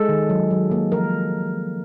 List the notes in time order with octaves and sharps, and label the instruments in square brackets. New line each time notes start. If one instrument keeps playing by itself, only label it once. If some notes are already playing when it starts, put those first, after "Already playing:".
Already playing: [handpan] G#3 A4
D#3
F#3
F#3
A#3
F3 A#4